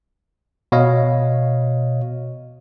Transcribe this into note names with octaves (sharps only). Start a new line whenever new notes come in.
B2 C#5 D#5 F5